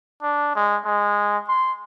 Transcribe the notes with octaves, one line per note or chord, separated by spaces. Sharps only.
D4
G#3
G#3
C6